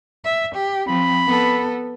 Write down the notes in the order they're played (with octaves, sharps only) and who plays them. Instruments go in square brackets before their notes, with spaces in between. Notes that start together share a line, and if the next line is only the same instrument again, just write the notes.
[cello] E5
G4
[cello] F3 C4 [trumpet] B5
[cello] B3 A4